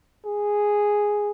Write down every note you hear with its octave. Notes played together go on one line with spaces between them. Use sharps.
G#4